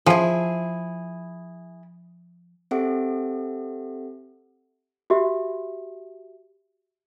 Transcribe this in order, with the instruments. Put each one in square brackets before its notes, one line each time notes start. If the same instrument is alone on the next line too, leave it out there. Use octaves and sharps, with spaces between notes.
[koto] F3 [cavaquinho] E4 G#4
[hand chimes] C4 G4 A4 E5 F#5
[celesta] F#4 G4 E5